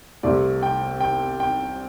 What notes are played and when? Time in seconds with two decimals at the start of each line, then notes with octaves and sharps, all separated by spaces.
0.23 C2 C3 A3 C4 D5
0.63 G5
1.00 G5
1.40 G5